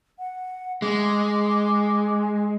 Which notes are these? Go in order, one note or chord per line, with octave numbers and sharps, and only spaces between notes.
F#5
G#3 D6